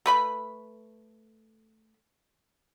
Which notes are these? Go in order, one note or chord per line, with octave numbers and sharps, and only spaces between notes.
A3 B4 B5